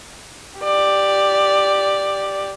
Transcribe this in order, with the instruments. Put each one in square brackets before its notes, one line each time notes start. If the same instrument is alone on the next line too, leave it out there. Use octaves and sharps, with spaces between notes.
[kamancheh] G4 D5